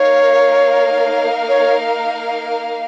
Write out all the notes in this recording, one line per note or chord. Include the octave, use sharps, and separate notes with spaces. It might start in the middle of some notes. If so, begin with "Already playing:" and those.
Already playing: A#3 D#4 A#4 C#5 F5
C#5